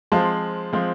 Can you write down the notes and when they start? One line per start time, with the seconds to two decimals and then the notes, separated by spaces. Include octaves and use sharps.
0.12 F3 G#3 C4 F4 A5
0.73 F3 G#3 C4 F4